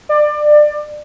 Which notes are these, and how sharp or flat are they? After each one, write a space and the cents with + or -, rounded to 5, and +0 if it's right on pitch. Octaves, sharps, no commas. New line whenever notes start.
D5 +25